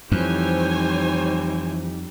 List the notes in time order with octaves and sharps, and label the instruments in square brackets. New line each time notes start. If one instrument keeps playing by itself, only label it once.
[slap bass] F2 [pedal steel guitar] E3 [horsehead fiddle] G3 D#4 [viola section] C5 C#5 G#5